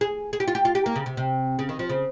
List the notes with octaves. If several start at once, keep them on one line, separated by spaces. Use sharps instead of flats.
G#4
G#4
G4
F4
G4
F4
G4
A#3
C#3
C3
C3
C#3
D#3
F3
C#3